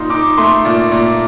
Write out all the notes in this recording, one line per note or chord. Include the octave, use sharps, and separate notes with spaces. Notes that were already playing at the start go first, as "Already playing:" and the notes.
Already playing: A#2 D#4 C6
D#4 D6
A3 C6
A#2
A#2